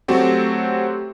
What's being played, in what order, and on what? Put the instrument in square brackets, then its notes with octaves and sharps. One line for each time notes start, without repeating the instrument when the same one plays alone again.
[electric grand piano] F#3 A3 C4 F#4 G4